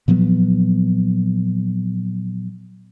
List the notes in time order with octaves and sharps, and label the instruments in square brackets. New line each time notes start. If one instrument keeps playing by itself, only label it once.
[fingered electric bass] A#2 F3 F#3 B3